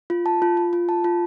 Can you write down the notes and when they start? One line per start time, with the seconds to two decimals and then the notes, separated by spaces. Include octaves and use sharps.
0.10 F4
0.26 A5
0.42 F4
0.57 F4
0.73 F4
0.89 A5
1.04 F4